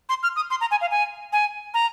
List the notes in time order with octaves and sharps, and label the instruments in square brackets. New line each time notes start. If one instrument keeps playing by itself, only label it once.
[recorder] C6
F6
D#6
C6
A#5
G#5
F5
G#5
G#5
A#5